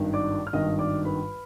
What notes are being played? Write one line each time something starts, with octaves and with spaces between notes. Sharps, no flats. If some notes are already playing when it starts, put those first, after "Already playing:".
Already playing: G#1 G2 D#3
D5 D6
F6
G#1 G2 D#3 D#5 D#6
D5 D6
B4 B5